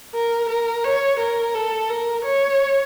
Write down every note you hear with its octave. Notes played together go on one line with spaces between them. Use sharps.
A#4
A#4
C#5
A#4
A4
A#4
C#5